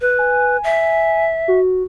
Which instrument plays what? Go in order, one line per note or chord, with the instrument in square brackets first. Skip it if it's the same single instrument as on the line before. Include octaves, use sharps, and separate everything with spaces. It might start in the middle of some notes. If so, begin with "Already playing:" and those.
[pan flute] B4
[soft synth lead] G#5
[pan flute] E5
[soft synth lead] F#4